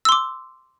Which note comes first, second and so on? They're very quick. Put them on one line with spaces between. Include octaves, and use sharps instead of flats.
E6 C6 D6